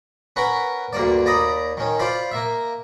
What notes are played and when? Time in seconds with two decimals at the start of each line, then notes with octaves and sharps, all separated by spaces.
0.36 C#4 A#4 B4 F#5 B5
0.93 D2 G2 A#3 D5
1.25 D#2 D5 A#5 B5 D#6
1.77 D#3 C#4
1.99 F4 C5 D5 F5 B5
2.31 A#3 E5